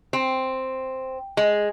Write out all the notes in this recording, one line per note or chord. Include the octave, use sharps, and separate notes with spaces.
C4
G#3